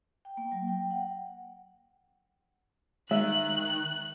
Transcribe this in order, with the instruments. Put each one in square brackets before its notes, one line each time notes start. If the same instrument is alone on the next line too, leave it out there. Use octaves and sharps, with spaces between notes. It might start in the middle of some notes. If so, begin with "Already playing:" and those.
[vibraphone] G5
A#3
F#3
G5
F#5
[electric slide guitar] D#3 [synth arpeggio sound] G#3 [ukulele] E5 [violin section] F#6